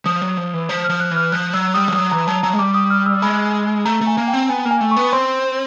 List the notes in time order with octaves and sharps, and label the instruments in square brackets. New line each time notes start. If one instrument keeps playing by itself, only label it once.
[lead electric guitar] F3 [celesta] D#6
[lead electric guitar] F#3
F3
E3
F3
[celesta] F6
[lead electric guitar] F3
[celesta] F#6
[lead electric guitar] E3
[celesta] F6
[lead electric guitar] F3 [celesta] F#6
[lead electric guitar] F#3 [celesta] E6
[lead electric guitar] G3 [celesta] D#6
[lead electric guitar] F3
[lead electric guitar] F#3 [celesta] D#6
[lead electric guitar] E3 [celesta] A#5
[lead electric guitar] F#3 [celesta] A5
[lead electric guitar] F#3 [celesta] A#5
[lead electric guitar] G#3
[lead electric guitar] G3 [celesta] D6
[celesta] D#6
F6
E6
[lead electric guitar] G#3 [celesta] B5
[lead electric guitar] A3 [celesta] A#5
[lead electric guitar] A3
[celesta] G#5
[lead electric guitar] A#3
[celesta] G5
[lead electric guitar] C4
[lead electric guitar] B3 [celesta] G#5
[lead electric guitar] A#3
[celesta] G#5
[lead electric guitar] A3
[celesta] C#6
[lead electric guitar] B3
[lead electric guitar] C4 [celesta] C6